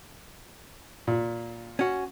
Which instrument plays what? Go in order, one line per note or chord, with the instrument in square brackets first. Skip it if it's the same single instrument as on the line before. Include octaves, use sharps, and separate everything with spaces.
[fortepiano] A#2
[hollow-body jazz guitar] C#4 F#4